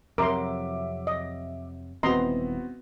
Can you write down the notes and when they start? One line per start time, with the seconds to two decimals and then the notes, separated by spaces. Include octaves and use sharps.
0.18 F2 C3 F#3 A#4 E5 C6 D6
1.07 D#5
2.03 D#1 E3 B3 C4 F#4 D#5 A#5 C6